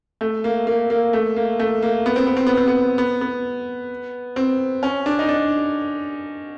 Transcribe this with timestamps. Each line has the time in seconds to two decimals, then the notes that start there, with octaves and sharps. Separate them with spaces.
0.21 A3
0.44 A#3
0.67 A#3
0.90 A#3
1.13 A3
1.36 A#3
1.60 A3
1.82 A#3
2.06 B3
2.16 C4
2.27 B3
2.37 C4
2.47 B3
2.57 C4
2.68 B3
2.98 B3
3.21 B3
4.36 C4
4.83 C#4
5.06 D4
5.19 D#4
5.29 D4